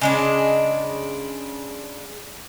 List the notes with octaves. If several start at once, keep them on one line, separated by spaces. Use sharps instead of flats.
C#3 G#3 D4